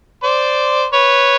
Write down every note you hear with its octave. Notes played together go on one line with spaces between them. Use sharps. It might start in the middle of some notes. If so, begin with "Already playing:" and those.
C5 D5
B4 C#5